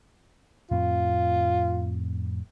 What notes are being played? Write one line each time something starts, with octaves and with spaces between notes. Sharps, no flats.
F2 A2 C4 F4